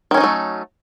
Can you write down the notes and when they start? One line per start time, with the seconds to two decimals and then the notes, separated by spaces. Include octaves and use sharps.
0.11 D#3
0.14 C#4
0.17 D#4
0.21 F#3
0.24 A3